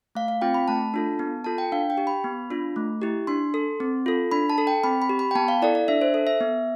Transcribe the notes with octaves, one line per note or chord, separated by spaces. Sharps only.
A3 F5
F5
C4 F4 G5
B5
A3 A5
D4 F4 A4
B3
F4 A4 A5
G5
D4 F5
G5
G4
B5
B3
D4 F4
A3
E4 G4
D4 C6
A4
C4
F4 A4
D4 B5
A5
A4
G5
C4 B5
B5
G4
B5
G5
B3 A5
F5
E4 A4 D5
D5
D4 E5
C5
A4
E5
B3